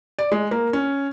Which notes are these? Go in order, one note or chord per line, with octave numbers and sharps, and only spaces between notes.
D5
G#3
A#3
C#4